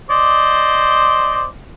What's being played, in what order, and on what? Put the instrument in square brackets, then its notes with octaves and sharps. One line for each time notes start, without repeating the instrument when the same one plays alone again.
[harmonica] C5 D5 D#5